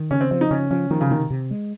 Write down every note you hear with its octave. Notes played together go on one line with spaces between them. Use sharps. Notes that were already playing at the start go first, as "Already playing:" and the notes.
Already playing: D#3
C#3 C#4
C4
F3 C4
D#4
C#3 C#4
F3 C#4
D#3 F3
C#3
C3 D#3
C3
G#3